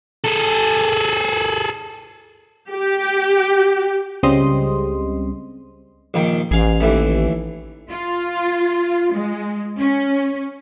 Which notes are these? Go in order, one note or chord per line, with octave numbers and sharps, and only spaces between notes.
G#4 A4
G4
C#2 C#3 G3 C4 D#5 C6
A#1 D#3 G5
A1 G#4 F5
D#2 E3 A3
F4
G#3
C#4